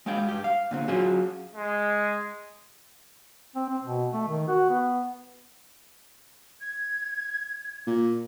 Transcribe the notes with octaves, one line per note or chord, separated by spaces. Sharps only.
G#3 F5 G5
G2 G4
F5
A#2 D3 C4
F#3 C#4 F4 F#4 G#4
G#3
C4
C4
B2
A3
D#3
F#4
B3
G#6
A#2